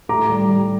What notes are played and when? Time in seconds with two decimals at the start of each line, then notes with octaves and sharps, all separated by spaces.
0.09 A2 A#5 D6
0.30 G3
0.49 G3